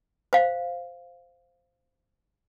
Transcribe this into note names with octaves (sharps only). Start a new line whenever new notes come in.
C5 F5